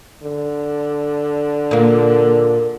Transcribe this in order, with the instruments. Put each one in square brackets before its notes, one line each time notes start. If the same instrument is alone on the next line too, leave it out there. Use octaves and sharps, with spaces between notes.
[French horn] D3
[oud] A#2 A#3